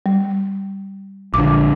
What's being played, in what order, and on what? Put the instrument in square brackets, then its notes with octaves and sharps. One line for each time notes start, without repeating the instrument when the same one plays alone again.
[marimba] G3
[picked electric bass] A#1 D3 [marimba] D6